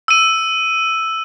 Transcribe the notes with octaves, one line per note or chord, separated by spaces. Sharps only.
E6 D#7